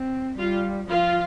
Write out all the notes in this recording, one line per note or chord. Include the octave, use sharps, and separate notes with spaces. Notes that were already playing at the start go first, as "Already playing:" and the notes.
Already playing: C4
G3 F4
F3 F4